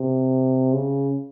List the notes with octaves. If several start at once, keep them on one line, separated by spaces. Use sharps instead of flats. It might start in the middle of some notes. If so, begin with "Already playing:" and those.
Already playing: C3
C#3